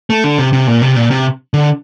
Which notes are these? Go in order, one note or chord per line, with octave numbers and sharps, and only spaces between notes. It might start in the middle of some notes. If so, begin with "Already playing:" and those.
A3
D3
C3
C3
A#2
C3
A#2
C3
D3